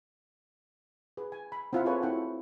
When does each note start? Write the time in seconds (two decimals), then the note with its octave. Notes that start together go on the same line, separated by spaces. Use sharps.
1.17 G#4 B4
1.32 G#5
1.52 B5
1.73 C4 E4 F4 E5 F#5 B5
1.85 G#4 A4 B4 C#5 G#5 A5
2.02 C4 E4 F#4 F#5 G5